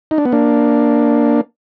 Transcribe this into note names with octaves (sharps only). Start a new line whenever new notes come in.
D#4
D4
B3
A#3 D4